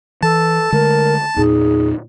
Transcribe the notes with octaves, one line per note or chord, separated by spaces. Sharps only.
E3 A4 A5
D3 G#3 A3 A#4
E2 A#2 D#4 G#4